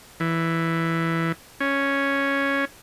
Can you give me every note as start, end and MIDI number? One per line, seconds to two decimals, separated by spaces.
0.20 1.32 52
1.60 2.65 61